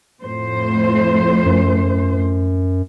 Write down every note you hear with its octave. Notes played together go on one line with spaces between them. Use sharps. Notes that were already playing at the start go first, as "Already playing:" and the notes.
F2 A2 C5
F#2